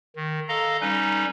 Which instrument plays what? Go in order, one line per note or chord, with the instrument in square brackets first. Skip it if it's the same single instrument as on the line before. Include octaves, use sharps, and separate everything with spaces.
[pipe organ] D#3
A4 D#5 F5 A#5
G3 C#4 D#4 B4